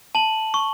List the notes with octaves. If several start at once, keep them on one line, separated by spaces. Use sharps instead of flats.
A5 F#7
C#6